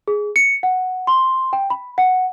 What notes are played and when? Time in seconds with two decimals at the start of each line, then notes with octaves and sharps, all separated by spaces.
0.08 G#4
0.36 C#7
0.63 F#5
1.07 C6
1.53 G5
1.70 B5
1.98 F#5